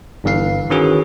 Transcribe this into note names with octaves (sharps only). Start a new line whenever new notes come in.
G1 G2 E3 F5 C7
D#3 E3 C#4 F#4 G#4